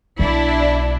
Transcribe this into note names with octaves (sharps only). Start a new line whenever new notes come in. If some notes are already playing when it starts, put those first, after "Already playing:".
B1 B2 D4 E4